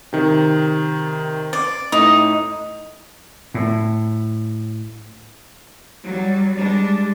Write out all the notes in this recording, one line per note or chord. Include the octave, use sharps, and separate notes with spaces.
C3 D#3
D5
A2 D#4
A2
F#3 G3
G3 G#3 D4